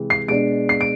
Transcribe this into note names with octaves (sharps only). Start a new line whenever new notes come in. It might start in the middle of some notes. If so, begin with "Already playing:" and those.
Already playing: C3 E3 G#3
C7
B2 G#3 D4 D7
C7
D7